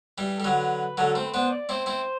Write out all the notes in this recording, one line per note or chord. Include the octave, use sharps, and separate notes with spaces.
E3 G3
A4
G3
D3 F#3 B4
D3 F#3 A4
A3 C4 C5
B4
B3 D4 C5
D5
C4 E4 C5
C4 E4 C5